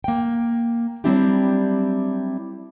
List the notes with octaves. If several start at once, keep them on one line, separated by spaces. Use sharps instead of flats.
A#3 G5
F#3 G3 C4 D4 E4 G4